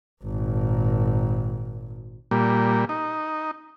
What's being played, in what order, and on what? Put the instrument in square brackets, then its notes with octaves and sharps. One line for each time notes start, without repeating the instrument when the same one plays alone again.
[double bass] G#1 A#2
[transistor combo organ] A#2 G3
D#4